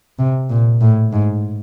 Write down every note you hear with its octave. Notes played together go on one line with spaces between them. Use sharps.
C3
A#2
A2
G#2